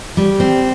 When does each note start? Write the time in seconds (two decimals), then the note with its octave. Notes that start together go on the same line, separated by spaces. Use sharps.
0.17 G3
0.40 C4